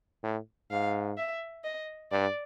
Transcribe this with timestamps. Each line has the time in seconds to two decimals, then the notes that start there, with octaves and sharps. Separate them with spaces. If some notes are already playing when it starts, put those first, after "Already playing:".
0.23 A2
0.71 G#2 F5
1.18 E5
1.64 D#5
2.11 G2 D5